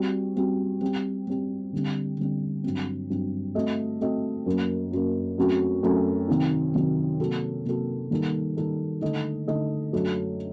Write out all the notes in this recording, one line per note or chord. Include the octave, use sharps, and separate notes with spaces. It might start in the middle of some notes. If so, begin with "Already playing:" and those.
Already playing: G3 C4 F#4
G3 C4 F#4
G3 C4 G4
G3 C4 G4
D3 G3 C4
D3 G3 C4
G2 F#3 C4
G2 F#3 C4
A3 C4 F#4 A4 D#5
A3 C4 F#4 A4 D#5
F#2 F#3 A#3
F#2 F#3 A#3
F#2 F#3 A3 C4 F#4
F#2 F#3 A3 C4 F#4
C3 D#3 F#3 C4 D#4
C3 D#3 F#3 C4 D#4
C3 F#3 A#3 F#4 A4
C3 F#3 A#3 F#4 A4
D#3 G3 A#3 D#4 A4
D#3 G3 A#3 D#4 A4
D3 A3 D#4 A4 D#5
D3 A3 D#4 A4 D#5
F#2 F#3 A3 D4 A4